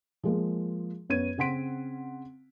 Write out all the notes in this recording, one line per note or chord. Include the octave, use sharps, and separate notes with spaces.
F3 G#3 A#3
F#2 B3 C#5 G#6 D#7
C#3 C4 F#5 C6 B6 D7